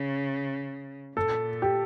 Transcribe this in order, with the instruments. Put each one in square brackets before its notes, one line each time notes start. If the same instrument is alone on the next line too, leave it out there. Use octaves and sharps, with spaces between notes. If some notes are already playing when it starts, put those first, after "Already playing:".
Already playing: [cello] C#3
[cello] A#2 [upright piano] A4
[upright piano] G4